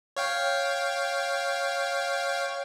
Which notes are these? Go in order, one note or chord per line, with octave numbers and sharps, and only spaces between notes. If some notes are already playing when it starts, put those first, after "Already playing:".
C#5 F5 G5